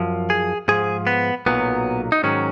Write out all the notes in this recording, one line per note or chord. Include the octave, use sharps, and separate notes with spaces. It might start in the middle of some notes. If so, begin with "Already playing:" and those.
Already playing: F#2 F3
G#4
G#2 F3 G#4
B3
B1 A#2 F#3 B3
D#4
G#2 D#3 F#3 C#4